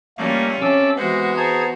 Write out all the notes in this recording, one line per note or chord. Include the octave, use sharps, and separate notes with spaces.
G3 A3 A#3 C#4 F4
C3 C#4 A5 D6 E6
E3 G#3 B3 F#4 C5 F#5
G#4 C5 A5 A#5 G#6